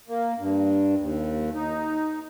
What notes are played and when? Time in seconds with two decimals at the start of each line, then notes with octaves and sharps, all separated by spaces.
0.08 A#3
0.38 G2
0.97 D#2
1.53 D#4